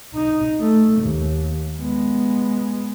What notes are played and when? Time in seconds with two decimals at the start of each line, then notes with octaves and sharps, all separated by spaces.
0.14 D#4
0.60 A3
1.00 D#2
1.80 G#3 B3